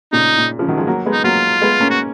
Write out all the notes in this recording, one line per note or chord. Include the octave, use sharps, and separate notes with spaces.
A#2 C#3 D#4
A#2
C#3 F3
D#3 F#3
F3 G#3
F#3 A#3
G#3 B3
D#4
F#3 A#3 F4
G#3 B3
A#3 C#4
F#4